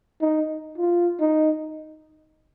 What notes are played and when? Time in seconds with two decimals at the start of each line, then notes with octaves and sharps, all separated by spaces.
0.21 D#4
0.78 F4
1.21 D#4